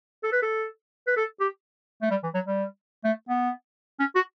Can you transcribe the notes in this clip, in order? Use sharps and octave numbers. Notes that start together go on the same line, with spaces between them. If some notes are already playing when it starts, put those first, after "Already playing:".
A4
B4
A4
B4
A4
G4
A3
G3
E3
F#3
G3
A3
B3
C#4
F#4